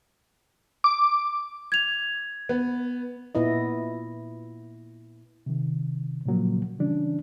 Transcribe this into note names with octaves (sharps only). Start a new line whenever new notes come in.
D6
G#6 F7
B3
A#2 B3 E4 D#5
C3 D#3
A#2 C#3 F3 F#3 A#3
C#3 E3 G3 C#4 D4